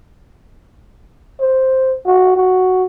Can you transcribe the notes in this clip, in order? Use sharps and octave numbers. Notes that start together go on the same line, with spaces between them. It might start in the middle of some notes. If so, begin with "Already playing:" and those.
C5
F#4
F#4